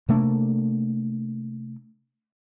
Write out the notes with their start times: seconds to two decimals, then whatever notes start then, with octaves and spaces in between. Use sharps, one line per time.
0.09 C3 A3 A#3 D4